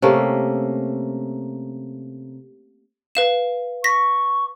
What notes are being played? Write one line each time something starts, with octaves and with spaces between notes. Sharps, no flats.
C3 A3 A#3 C#4
B4 F5 E7
C#6 A#6 B6